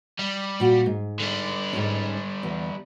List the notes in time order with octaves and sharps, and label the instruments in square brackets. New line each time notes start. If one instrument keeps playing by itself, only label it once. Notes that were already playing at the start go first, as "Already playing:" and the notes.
[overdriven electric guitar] G3
[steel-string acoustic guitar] A#2 F#4
G#2
[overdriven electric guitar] D3 G3
[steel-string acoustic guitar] G#2 C#4
E2